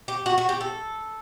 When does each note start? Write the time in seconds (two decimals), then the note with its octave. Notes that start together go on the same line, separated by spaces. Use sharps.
0.08 G4
0.26 F#4
0.38 F#4
0.49 G4
0.61 A4